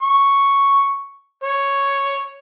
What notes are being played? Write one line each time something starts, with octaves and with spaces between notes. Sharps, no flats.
C#6
C#5